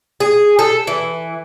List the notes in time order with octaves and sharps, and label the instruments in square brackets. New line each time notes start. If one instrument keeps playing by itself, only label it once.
[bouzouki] G#4
A4
E3